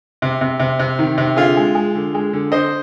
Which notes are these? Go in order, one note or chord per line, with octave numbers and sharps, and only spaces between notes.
C3
C3
C3
C3
D#3
C3
D3 F4 G#4
G#3
G#3
D3
G#3
D3
D3 C5 D#5